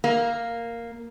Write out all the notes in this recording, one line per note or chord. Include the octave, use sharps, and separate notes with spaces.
A#3